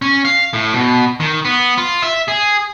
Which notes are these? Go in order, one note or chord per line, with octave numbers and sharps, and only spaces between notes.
C#4
F5
A2
B2
D#3
B3
F4
E5
G#4